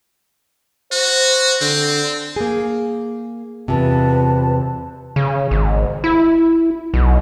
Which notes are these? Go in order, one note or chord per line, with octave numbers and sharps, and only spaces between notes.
F#4 C5
D3 C4
A#3 G#4
E2 G#2 C3 F4 B4 A5
C#3
G#1
E4
B1